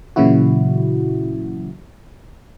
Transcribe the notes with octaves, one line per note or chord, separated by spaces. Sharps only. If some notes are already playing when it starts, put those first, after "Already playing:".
A#2 C#3 E3 F#3 E4 F#4